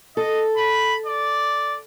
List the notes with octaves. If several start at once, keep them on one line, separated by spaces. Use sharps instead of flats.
A4 D#5
B5
D5